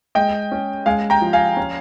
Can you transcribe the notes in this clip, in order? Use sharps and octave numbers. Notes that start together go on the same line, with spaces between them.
G#3 D#5 G5
C#4
G#3 F5 G#5
G5 A#5
F3
F5 G#5
C#4